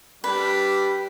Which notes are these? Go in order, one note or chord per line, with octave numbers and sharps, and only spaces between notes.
G3 D4 G4 B4